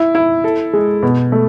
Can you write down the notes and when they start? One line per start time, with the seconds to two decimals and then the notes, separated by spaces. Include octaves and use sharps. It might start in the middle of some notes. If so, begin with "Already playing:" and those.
Already playing: E4
0.15 E4
0.44 A4
0.73 G#3
1.03 B2
1.32 A3